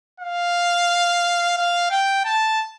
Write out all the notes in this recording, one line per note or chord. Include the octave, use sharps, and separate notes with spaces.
F5
F5
G5
A5